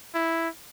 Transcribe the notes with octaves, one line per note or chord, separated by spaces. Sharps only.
E4